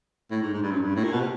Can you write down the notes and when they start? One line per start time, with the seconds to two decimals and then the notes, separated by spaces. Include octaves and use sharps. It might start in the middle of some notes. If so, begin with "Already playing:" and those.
0.31 A2
0.42 G#2
0.53 G#2
0.62 G2
0.71 F#2
0.81 G2
0.96 A2
1.04 A#2
1.12 B2
1.21 C3